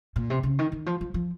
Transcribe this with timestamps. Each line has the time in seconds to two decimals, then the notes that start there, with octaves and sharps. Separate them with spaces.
0.16 A#2
0.30 C3
0.43 C#3
0.59 D#3
0.72 D#3
0.86 F3
1.01 F3
1.14 F3